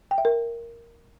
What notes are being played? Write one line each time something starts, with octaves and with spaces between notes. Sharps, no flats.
G5
E5
A#4